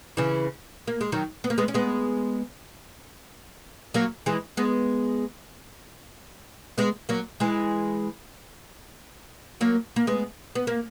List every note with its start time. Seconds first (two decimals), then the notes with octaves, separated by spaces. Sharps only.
0.17 C#3 E3
0.87 A#3
1.01 G#3
1.12 D#3 F#3
1.44 B3
1.50 A#3
1.58 G#3 B3
1.68 C#4
1.74 G#3 B3
3.94 F#3 A#3
4.26 E3 G#3
4.57 G#3 B3
6.78 G#3 B3
7.09 F#3 A#3
7.40 E3 G#3
9.61 F#3 A#3
9.96 A#3
10.07 G#3 B3
10.55 B3
10.67 A#3